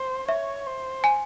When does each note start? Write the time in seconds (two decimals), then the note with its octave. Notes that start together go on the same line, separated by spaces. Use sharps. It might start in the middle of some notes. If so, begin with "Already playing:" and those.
Already playing: C5
0.28 C#5 E5
0.67 C5
1.04 G#5